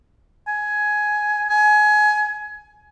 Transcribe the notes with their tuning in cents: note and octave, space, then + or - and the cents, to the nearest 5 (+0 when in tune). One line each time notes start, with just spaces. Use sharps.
G#5 +15
G#5 +25